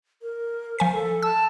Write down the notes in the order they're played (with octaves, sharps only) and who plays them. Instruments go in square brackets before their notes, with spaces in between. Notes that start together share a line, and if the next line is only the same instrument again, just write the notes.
[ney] A#4
[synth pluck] F3 G#5 B6 [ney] C5
[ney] A4
[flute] A5 [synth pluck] E6